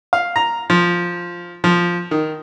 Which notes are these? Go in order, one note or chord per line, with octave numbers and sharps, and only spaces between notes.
F5
A#5
F3
F3
D#3